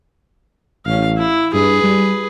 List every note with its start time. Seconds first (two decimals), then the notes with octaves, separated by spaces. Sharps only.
0.86 A1 C#4 F5
1.16 E4
1.54 G2 G#4 B4
1.83 G3